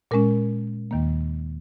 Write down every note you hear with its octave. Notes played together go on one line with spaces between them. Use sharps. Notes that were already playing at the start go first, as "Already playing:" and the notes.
A#2 G#3 C#4 A#4
D#2 D#3 A#3